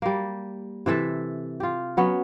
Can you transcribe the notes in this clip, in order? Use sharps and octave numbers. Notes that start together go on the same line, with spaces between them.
G3 A#3
C3 E3 A4 E5
F4 G4
F#3 B3 C#4